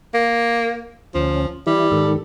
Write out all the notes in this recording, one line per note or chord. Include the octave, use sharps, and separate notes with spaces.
A#3
D2 F3 C#4
E3 G3 E4
G#2 D#3 A4